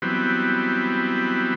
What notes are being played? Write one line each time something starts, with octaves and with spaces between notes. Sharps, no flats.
E3 F#3 G3 B3 C4